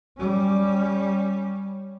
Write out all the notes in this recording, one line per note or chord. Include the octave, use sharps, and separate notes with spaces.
G3 C#4